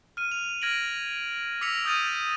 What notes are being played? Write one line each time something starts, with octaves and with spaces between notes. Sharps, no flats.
F6 D#7
F7
F6 G#6 A#6 D7 F#7
D6 E6 A#6 B6 C#7 F7
D#6 F6 G6 A6 D#7 F7